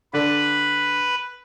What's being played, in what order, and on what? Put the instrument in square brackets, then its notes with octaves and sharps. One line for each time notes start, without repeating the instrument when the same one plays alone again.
[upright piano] D3 D4 A4 [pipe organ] B4